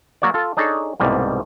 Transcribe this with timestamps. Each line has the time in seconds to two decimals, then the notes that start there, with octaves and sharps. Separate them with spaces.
0.22 F#3 A#3 F#4 C#5 D5
0.34 F4 A4
0.57 D4 D#4 G#4 A4 C#5
1.00 C2 G#2 B2 G3 A#3